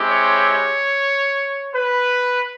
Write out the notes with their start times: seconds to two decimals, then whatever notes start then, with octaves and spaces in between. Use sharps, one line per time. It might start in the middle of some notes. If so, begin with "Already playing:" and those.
Already playing: G#3 C4 E4 G4
0.08 C#5
1.73 B4